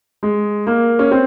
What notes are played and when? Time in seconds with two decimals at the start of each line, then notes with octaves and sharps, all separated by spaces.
0.23 G#3
0.67 A#3
0.99 C#4
1.11 C4